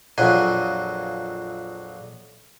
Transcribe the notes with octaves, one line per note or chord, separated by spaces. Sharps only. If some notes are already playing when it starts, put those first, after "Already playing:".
A#1 F2 F#3 G#5 C6